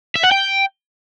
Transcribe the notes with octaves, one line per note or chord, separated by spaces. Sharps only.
E5
F#5
G5